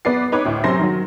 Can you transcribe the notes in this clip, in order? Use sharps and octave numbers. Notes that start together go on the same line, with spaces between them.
B3 B4 D5 C7
D#4 B4 C#5 D6
D2 A2
F#2 C3 C#4 C5 C6 A#6
D#3 F#3